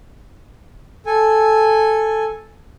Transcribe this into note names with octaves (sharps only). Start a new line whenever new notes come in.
A4 G#5